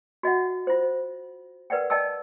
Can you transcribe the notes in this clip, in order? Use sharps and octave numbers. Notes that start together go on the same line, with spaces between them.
F#4 D#5 E5 F#5
F4 C5
A#4 B4 D5 F#5 G5
D5 D#5 G5 A5 E6